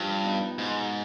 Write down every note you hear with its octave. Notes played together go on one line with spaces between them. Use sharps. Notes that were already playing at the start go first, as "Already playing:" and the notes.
Already playing: G2 F3
B3 D#4
G#2 B2